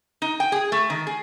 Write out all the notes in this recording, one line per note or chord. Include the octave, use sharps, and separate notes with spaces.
D#4
G5
G#4
A3
D#3
G#4